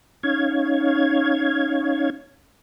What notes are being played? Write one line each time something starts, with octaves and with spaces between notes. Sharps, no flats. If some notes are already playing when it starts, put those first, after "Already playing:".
C#4 D#4 C#5 F5 G#6